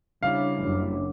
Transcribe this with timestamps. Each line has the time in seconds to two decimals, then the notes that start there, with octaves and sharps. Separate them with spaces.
0.23 C#3 G3 D4 E4 C#5 F5 D6
0.58 F#1 F#2